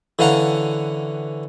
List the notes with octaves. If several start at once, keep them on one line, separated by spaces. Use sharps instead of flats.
D3 E3 C#4 F5 F#5 A#5